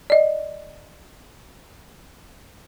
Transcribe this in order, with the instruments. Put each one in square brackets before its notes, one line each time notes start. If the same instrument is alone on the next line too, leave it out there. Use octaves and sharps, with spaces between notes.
[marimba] D5 D#5